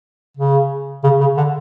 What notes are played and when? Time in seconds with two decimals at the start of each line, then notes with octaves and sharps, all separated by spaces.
0.37 C#3
1.04 C#3
1.20 C#3
1.37 D3